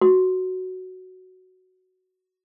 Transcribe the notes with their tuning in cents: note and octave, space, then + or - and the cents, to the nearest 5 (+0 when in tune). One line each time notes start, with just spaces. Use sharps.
F#4 +5